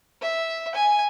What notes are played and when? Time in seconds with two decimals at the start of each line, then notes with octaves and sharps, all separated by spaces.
0.21 E5
0.75 G#5